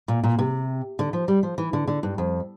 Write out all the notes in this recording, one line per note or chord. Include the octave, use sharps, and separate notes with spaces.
A#2
A#2
C3
D3
F3
G3
F3
E3
D3
D3
G2
F2